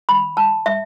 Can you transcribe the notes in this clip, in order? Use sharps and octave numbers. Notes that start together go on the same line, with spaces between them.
B5
A5
E5